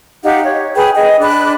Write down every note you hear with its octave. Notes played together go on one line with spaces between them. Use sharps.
D#4 G4 F5 F#5
C#5
G#4 B4 G5
G#4 D#5
D4 B5 F#6